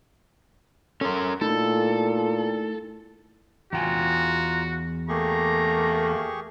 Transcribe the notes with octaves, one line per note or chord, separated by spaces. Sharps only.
C#4 A4 A#4 C6
A#2 A3 D#4 E4 A4
E2 F4 F#4 G5 G#5 A#5
A3 A#3 G4 G#4 A#5 C#6